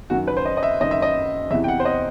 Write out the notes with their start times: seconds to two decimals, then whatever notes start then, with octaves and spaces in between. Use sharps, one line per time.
0.10 F#2 D#3 F#4
0.27 B4
0.37 C5
0.45 D#5
0.57 D#5
0.63 E5
0.80 F#2 D#3 D#5
0.91 E5
1.02 D#5
1.50 E2 C3 E3 E5
1.64 G5
1.68 F#5
1.80 C5
1.85 D#5